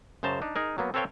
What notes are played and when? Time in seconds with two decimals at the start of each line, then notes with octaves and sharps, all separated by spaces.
0.23 F#2 C#3 C5 A5 A#5
0.42 D4 D#4
0.56 D#4 G#4 A#4
0.78 F#3 A#3 B3
0.94 C4 A4 B4 C#5 F5 G5